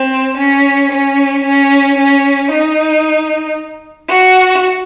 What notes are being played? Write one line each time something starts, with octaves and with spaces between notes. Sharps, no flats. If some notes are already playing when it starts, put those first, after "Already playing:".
Already playing: C4
C#4
C#4
C#4
C#4
D#4
F#4